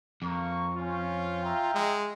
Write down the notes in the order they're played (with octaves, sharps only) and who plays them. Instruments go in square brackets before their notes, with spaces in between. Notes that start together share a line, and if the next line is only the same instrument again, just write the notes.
[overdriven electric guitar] F2 [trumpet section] A#3 C#6
[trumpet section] C#4 C5 [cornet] F4
[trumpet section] E5 G5 A#5
[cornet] G#3